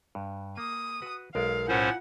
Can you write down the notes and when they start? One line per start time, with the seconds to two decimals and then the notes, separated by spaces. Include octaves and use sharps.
0.15 G2
0.57 A#3 D#6
1.02 F#4 B4
1.35 B1 G#3 A#4 D5 F5
1.69 A2 C#4 F4 C5 F#5